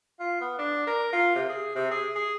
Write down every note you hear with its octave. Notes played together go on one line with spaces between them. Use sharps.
F4
B3
D4
A#4
F4
C3
G#4
C3
G#4
G#4